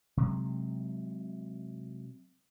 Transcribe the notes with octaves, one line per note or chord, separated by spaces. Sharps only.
C3 F#3 G#3